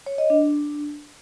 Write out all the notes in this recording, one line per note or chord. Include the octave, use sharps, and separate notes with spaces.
C#5
D#5
D4